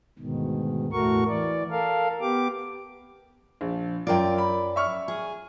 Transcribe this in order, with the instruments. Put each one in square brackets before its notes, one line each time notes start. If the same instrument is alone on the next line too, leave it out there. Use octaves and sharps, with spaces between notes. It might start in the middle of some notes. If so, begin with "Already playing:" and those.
[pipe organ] D2 G#2 B2 D#3
E2 A2 A3 F#4 A#4 C#6
E3 D5
A4 A#4 F5
B3 G4 D6
[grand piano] A#1
[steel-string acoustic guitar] F#2 D5 [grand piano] F4 A#4 G5
[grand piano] B5
E5 C#6 F6
[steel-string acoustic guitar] G#4